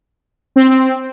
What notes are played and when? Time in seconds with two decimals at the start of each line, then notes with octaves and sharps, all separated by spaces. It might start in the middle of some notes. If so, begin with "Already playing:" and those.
0.56 C4